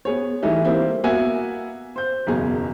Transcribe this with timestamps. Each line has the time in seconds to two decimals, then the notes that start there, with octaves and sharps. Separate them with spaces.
0.05 B3 G#4 C#5
0.43 E3 G3 A3 D#4
0.65 G3 A#3 C4 E4
1.04 A#3 B3 F#4 E5 G#5
1.96 C5 G6
2.27 F#1 B1 E2 G#4 A#5